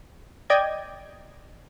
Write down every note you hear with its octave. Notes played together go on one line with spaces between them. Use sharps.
D5 D#5 G5 G#6